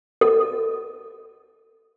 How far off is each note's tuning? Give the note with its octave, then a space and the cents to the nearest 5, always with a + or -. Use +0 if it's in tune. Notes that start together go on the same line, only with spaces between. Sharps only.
A4 +25